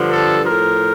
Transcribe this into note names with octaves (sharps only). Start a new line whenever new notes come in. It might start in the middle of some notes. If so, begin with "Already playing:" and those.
Already playing: G2 D3 F3
A4
A2 F3 A#4